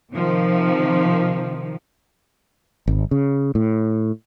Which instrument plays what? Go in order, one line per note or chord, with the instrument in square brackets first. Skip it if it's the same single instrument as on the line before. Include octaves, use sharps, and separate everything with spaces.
[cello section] C3 D#3 F3
[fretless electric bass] G#1
C#3
A2